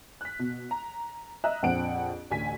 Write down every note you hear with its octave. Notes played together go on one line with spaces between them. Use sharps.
F#6 B6
B2
A#5
D#5 E5 A#5 F#6
A#1 F2 C4 F#5 D7
A1 D2 G#5 B6